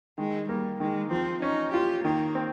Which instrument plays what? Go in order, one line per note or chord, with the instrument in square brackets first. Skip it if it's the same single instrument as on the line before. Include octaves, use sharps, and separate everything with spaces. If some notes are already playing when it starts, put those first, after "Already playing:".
[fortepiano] D#3 [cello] G#3
[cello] G3 [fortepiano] A#3
[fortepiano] D#3 [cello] G#3
[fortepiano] F3 [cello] C4
[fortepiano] C#4 [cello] D#4
[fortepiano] F4 [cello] G4
[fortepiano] D#3 [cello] A#3
[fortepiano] C4